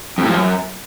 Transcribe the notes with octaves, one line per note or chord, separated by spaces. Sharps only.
F2
A2
F3
F#2